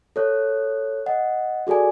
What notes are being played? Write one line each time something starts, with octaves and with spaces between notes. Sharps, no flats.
A4 C#5 F#6
D#5 F#5
F#4 G#4 A4 D5 G#5